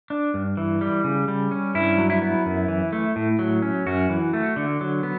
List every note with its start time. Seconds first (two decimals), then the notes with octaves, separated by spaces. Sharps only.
0.10 D4
0.34 G2
0.57 E3
0.81 G3
1.04 C#3
1.28 G3
1.51 C#4
1.75 G2 E4
1.98 F#3
2.10 E4
2.22 B3
2.46 F#2
2.68 E3
2.93 A3
3.16 A2
3.39 F#3
3.62 C#4
3.86 F#2 F#4
4.10 E3
4.33 A3
4.56 D3
4.81 F#3
5.03 B3